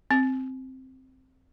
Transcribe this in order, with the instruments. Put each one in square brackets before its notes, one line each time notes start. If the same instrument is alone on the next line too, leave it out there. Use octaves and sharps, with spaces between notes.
[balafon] C4